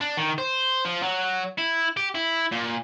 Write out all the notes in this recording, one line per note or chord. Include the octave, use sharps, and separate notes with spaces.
D4
D#3
C5
F3
F#3
E4
G4
E4
A#2